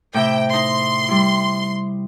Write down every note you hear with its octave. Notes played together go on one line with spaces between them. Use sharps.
A2 C3 E5 G5
D#4 C6
G3 E4